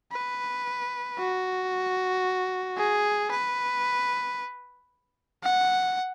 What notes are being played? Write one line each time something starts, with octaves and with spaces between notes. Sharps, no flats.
B4
F#4
G#4
B4
F#5